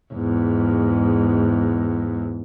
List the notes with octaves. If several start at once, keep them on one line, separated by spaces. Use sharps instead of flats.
E2 G#2